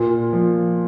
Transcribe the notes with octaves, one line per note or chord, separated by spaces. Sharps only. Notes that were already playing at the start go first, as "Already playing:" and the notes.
Already playing: A#2 F4
F3